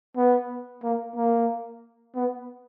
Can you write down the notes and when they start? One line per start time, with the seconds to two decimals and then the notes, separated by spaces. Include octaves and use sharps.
0.17 B3
0.83 A#3
1.16 A#3
2.15 B3